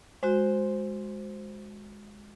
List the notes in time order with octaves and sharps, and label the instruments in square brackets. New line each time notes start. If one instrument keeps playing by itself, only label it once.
[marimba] G#3 F#4 [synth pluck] C5